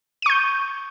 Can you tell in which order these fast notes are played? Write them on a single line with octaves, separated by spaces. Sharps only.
D#7 C#6 G6